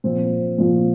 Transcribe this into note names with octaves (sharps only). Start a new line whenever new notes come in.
A#2 F3 C4
A#2 F3